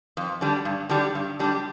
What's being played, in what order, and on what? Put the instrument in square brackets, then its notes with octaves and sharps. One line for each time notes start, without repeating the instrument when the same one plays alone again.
[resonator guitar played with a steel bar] F2
D3 G3 D4
G2
D3 G3 D4 G4
G2
D3 G3 D4 G4